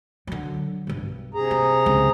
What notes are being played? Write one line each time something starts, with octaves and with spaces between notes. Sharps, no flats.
D3 F#3
B1 G2
C3 G#4 A#5
D4
C#2 C#3